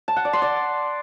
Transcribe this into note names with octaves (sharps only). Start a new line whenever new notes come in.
A5
F#5
D5
C6
D5